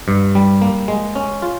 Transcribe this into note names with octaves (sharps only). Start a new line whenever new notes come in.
G2
G3
A#3
G#3
C#4
F4